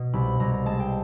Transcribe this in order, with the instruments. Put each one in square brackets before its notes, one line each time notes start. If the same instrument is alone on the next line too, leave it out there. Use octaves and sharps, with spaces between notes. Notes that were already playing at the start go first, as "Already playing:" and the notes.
Already playing: [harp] B2
C2 B5
C2 A#5
A#5
G#3 A5
G5